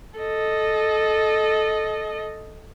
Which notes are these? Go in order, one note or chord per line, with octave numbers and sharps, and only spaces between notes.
A4 D#5